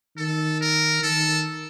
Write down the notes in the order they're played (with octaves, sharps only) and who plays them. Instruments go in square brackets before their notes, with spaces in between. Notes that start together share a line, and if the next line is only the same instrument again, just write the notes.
[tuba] D#3 [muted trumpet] A4
[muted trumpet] A#4
[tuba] D#3 [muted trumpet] A4